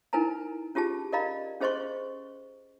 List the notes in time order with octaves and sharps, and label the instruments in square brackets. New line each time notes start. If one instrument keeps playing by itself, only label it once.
[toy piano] D#4 E4 A#4 B4 G#5 A#5
C#4 F4 G4 G#4 A5
A#4 D5 D#5 F5 A#5 B5
C#4 G#4 C5 D#5 C6 C#6